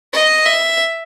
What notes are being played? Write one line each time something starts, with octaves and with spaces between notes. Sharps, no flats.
D#5
E5